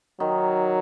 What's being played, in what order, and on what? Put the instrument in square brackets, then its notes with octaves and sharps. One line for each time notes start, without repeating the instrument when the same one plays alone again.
[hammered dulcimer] D#3 [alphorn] F#3